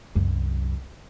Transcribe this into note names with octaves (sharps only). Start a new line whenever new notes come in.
C2 F#2